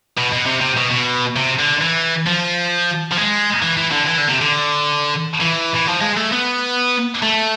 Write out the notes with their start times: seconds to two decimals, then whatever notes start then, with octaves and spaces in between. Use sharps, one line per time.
0.17 B2
0.32 B2
0.46 C3
0.61 C3
0.77 B2
0.91 B2
1.36 C3
1.59 D3
1.81 E3
2.27 F3
3.12 F3
3.17 G#3
3.62 E3
3.77 E3
3.91 D3
4.07 E3
4.18 D3
4.29 C3
4.41 D3
5.41 E3
5.75 E3
5.87 F3
6.01 G#3
6.17 A3
6.32 B3
7.22 A3